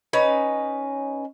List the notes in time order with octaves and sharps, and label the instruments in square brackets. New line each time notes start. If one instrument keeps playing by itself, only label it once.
[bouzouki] C#4 D#4 B4